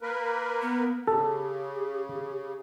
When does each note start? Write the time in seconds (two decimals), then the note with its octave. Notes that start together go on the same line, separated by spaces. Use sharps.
0.01 A#3 A#4 B4
0.61 B3
1.07 C#3 G4 A4